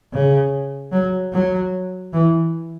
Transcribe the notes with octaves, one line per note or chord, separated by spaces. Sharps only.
C#3
F#3
F#3
E3